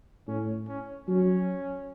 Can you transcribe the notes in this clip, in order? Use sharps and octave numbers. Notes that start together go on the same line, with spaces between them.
A2 C#4
C#4
F#3 C#4